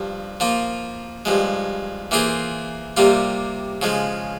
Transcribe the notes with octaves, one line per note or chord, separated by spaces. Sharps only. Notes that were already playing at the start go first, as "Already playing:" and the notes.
Already playing: G2 F3
F3 A#3 F4
G2 F3 G#3
E3 A#3 F4 G#4 C5
C3 G3 A#3 F4
C#3 F3 G#3